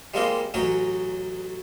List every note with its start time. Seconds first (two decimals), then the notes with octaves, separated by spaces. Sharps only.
0.14 G3 G#3 A#3 C4 D#4 F4
0.54 A1 F#3 C#4 D#4 C#5 C#6